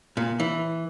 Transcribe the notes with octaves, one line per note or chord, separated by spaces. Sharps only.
A#2
E3